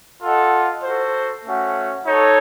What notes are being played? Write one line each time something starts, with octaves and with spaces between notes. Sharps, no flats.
F4 A4 D#5 F#5
F#4 A4 C5
A3 C#4 F#4
D#4 A4 C#5